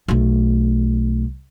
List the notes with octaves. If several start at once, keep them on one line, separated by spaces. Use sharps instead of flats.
B1 A3